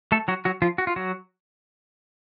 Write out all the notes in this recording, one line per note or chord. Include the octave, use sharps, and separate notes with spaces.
A3 A4
F#3 F#4
F#3 F#4
F3 F4
F#4
F4
F#3 F#4